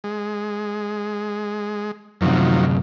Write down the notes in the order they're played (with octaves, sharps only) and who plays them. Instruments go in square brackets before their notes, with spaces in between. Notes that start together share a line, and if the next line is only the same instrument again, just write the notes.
[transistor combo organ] G#3
[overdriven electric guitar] F#2 C3 [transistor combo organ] D#3 F3 F#3